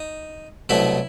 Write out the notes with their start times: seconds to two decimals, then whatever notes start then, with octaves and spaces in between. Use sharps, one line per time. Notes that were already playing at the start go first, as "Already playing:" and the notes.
Already playing: D#4
0.69 C2 B2 F#3 A3 E4